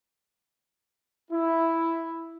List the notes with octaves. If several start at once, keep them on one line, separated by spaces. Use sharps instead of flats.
E4